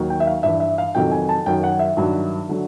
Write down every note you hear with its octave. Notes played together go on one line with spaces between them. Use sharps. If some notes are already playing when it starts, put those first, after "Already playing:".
Already playing: D#2 D#3 F#3
G5
E5
F5
G2 E3 E5
E5
F5
F2 C3 D#3 F#3 G5
G#5
A5
F#2 D#3 F#3 G5
F#5
E5
G2 D#3 F#3
D3 F#3